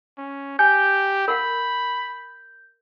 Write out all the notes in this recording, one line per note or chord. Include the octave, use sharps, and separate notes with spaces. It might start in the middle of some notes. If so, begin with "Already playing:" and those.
C#4
G4 G#5 G6
A#4 F5 F#5 B5